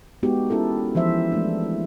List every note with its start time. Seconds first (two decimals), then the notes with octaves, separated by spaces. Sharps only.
0.23 G#3 B3 D#4 F#4 G4
0.50 C#4 E4 A4 A#4
0.95 E3 F3 C5 E5
1.32 G#3 A3 D4